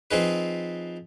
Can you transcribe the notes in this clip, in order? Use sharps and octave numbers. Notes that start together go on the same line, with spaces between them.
F3 C4 D#4 G#4 B4